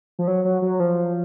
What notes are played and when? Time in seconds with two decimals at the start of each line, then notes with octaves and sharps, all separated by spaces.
0.19 F3
0.28 F#3
0.44 F#3
0.62 F#3
0.80 F3